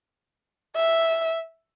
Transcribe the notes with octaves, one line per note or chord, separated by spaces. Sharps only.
E5